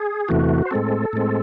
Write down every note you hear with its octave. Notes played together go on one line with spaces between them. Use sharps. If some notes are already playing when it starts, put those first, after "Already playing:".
Already playing: G#4
E2 C3 E3 A3 F#4
C5
A2 G#3 C4 A4
A2 G#3 C4